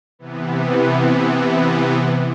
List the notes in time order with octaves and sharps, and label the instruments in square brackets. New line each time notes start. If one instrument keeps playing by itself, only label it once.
[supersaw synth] C3 E3 B3